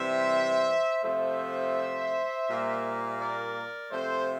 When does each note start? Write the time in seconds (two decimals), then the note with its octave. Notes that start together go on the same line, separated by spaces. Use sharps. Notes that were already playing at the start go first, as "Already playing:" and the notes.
Already playing: C3 E3 G3 C5 E5
1.04 C3 F3 A3 C5 E5
2.48 A#2 G3 A#3
3.20 A#4 D5
3.91 C3 F3 A3 A4 C5